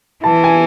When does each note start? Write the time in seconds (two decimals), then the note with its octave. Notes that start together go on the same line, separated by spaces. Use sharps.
0.24 E3 A5
0.44 G#5